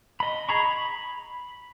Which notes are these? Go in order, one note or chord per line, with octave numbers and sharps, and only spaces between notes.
D#5 B5
G#4 A#5 B5 C#6
B5